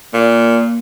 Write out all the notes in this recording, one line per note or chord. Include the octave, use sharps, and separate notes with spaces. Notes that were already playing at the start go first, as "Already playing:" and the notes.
A#2 A#3